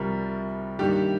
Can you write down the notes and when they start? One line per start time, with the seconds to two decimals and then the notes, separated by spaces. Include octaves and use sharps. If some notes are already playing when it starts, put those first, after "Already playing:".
Already playing: C2 C3 F3 G3 A#4
0.79 G2 D#3 G3 A#3 G4